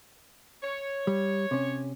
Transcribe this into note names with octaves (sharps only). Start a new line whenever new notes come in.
C#5
G3
C3 C#4